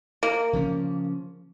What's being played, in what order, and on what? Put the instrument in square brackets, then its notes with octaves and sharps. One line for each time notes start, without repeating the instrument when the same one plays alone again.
[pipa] A#3
[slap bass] C#3 F3 C#4